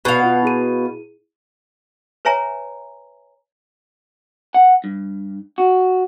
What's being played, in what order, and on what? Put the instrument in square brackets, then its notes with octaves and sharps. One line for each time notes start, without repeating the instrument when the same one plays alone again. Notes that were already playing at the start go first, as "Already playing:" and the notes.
[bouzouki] B2 F5
[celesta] F4 B4 F#5
E4 G#4 D#7
[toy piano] B4 C#5 E5 G#5 A#5
[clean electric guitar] F#5
G2
F#4